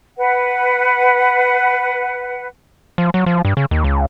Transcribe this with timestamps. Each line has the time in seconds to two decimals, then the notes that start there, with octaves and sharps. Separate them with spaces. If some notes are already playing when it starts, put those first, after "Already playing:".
0.17 B4 F#5
2.98 F3
3.14 F#3
3.26 F3
3.45 G2
3.57 C#3
3.71 D#2
3.84 C#2